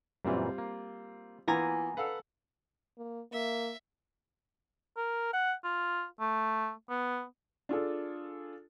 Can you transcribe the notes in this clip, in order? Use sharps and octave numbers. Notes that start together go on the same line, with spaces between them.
F#2 A#2 E3 G3 C4 F4
A#3
E3 A#3 B3 F4 G#5 A#5
A4 B4 F5 F#5
A#3
A#3 E5
A#4
F#5
F4
A3
B3
D4 F4 G#4 A4